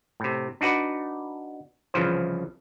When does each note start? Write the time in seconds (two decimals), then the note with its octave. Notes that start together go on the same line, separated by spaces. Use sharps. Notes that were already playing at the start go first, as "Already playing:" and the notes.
0.20 A2 C3
0.61 D4 D#4 F#4 B4 D5
1.94 C2 C#3 E3 F3 C5